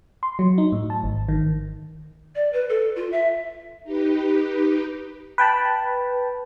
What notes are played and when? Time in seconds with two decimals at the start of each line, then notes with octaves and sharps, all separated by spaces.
0.23 C6
0.39 F#3
0.58 D#4
0.72 A2
0.90 A5
1.03 G#1
1.29 D#3
2.35 D5
2.53 B4
2.69 A4
2.96 F4
3.12 E5
3.84 D#4 G4 B4
5.38 B4 G5 A5 B5